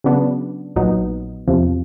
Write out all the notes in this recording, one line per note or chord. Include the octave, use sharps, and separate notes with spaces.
C#3 F#3 B3 D4
A#1 A#2 F#3 B3 D#4
E2 C3 F3